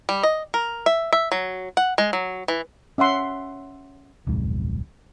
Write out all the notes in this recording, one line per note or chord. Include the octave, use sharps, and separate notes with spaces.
G3
D#5
A#4
E5
E5
F#3
F#5
G#3
F#3
E3
C#4 E5 F#5 C6
D1 B1 F2 G#2